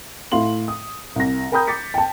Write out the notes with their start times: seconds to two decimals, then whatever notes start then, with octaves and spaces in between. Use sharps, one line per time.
0.32 A2 E4 F5 C6 F#7
0.68 D#6
1.16 C2 A#6
1.52 A#4 G5 A#5 B5 D#6 G6
1.67 D6 A6 B6 C#7
1.94 G5 A5